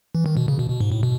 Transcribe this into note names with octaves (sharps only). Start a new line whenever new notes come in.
E3
D#3
B2
C#3
B2
B2
G#2
A2
B2